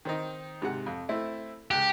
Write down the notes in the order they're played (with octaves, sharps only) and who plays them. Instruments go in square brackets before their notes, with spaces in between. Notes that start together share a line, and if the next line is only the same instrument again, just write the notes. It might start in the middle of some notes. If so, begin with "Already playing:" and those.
[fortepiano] D#3 C4 D#4
G#2 C3 F#5
F2
A3 C4 E4
[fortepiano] C#2 F#6 [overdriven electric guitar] G4